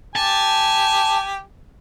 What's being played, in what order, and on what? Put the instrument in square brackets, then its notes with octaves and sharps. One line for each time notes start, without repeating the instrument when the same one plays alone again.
[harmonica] G4 G#5 [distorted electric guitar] A5